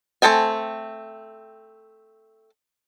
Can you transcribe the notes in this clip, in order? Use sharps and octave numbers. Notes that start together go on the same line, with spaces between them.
A3 C4 A4 G5 G#5